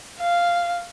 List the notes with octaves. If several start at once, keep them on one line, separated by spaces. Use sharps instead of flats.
F5